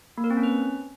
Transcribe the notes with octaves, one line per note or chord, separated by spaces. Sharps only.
A#3
A#4
C4
C#4
B4